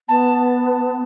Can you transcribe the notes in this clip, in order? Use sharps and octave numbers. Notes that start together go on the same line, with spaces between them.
B3 A5